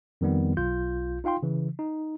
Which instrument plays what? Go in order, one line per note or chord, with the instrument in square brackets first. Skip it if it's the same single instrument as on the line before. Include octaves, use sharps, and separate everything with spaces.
[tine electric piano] F2 D#3 G3 B3
B1 F4 G6
D#4 F4 F5 G5 C6
C#3 E3
D#4